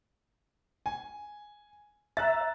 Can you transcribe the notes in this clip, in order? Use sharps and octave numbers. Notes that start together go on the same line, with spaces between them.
G#5
E5 A#5 F#6 A6